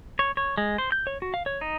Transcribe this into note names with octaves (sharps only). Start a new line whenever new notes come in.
C#5
C#5
G#3
C5
G6
C#5
F#4
F5
C#5
D#4